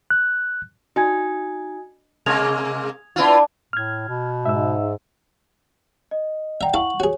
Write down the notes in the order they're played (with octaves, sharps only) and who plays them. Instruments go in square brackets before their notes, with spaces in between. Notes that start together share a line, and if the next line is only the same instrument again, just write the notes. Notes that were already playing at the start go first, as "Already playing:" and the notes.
[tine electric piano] F#6
[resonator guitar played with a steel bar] D#4 [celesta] F#4 G#5 G#6
[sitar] C3 G#3 A#3 [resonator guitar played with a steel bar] G#5 [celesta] D#6 G#6 F7
[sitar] B3 E4 F4 [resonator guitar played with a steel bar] D4 F5
[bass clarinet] A2 [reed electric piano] F6 G#6
[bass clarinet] B2
[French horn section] G#2 [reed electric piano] E5 E6
[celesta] D#5
[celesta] D5 F#5 G5 [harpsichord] E5 A#5
[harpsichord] E4 A4 F5 [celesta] F#5 C#6 F#7
[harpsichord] F#4 G#4 [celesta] C#5